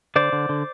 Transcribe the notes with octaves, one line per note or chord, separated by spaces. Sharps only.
D3 C5 D5
D3
D3